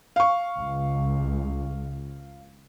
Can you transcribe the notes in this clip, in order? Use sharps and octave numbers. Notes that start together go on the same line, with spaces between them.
F5 C#6
C#2